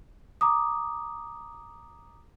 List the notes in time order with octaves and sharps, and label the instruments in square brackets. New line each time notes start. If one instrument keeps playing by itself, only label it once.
[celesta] A#5 D6 D#6